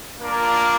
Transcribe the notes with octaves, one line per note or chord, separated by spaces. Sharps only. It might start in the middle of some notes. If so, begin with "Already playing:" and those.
A#3 D4 F4 A#4